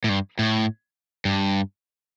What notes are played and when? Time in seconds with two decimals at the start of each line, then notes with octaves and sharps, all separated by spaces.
0.04 A2
0.09 G2
0.39 A2
1.25 G2